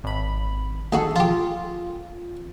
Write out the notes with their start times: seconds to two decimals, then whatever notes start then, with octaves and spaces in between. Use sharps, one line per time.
0.04 G#1 B5
0.92 D2 D#4 F#4 G#4 A4
1.16 F3 F4 G4